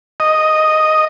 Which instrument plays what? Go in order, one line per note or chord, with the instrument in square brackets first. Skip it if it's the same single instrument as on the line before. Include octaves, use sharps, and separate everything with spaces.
[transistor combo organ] D#5